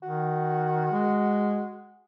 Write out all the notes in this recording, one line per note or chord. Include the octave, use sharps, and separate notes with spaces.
D#3 F#4
G#3